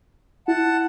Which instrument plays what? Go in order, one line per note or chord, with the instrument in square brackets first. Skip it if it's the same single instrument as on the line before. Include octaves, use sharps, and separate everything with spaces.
[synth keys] E4 [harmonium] F#5 A5